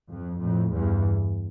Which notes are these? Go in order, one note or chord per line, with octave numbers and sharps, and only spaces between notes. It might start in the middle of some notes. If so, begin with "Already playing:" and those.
F2
F2 A2
E2 G2